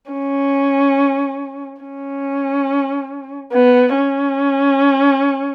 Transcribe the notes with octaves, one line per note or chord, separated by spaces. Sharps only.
C#4
C#4
B3
C#4